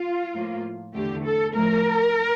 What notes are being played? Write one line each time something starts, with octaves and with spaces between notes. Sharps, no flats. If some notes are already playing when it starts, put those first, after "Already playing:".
Already playing: F4
A2 F3 A#3
E2 D3 A3 G4
A4
A2 F3 A3 A#4